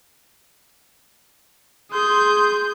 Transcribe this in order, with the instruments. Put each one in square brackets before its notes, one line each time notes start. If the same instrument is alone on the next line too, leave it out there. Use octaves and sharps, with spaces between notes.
[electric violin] G#4 G6 [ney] C6